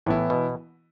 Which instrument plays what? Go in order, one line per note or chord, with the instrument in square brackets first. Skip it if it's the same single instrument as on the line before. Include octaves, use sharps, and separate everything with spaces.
[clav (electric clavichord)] A2 [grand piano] E3 B3 E4
[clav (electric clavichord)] B2